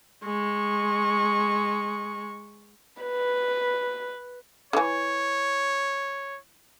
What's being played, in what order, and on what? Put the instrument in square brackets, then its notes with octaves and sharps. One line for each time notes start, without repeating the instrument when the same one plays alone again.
[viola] G#3 C#6
[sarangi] B4
[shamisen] D3 E3 [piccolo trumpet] C#5